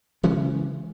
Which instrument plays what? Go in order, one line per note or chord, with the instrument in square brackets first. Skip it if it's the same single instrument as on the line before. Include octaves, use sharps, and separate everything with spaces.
[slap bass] C#3 E3 G#3 C#4